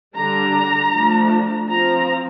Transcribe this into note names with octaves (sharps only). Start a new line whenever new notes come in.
D3 G3 D4 A#5
F3 A3 D4
F3 C4 A#5